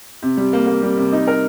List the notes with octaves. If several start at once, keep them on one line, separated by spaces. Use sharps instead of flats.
C3
G3
A#3
A#3
G3
C3
D#4
A#4